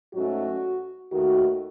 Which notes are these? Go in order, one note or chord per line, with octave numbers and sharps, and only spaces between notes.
G#2 F#3 A3 C#4 F#4
D#2 D#3 A3 F#4